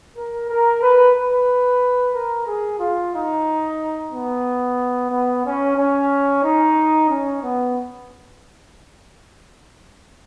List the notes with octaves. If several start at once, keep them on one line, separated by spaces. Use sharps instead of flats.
A#4
A#4
B4
B4
A#4
G#4
F4
D#4
B3
B3
C#4
C#4
D#4
C#4
B3